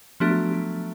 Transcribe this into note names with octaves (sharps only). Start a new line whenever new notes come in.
F3 F#3 A3 B3 D4
F#3
F#3